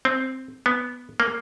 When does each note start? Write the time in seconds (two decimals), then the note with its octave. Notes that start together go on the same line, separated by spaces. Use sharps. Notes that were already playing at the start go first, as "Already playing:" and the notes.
0.05 C4
0.66 B3
1.20 A#3